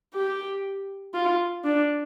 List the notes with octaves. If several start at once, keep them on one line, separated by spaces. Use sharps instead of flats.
G4
F4
D4